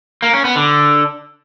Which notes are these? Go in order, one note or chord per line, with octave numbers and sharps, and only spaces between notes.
A#3
C#4
B3
D3